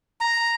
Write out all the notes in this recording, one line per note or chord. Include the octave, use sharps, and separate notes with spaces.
A#5